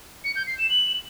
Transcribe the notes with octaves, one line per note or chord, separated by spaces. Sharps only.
C#7
G6
C7
E7
F#7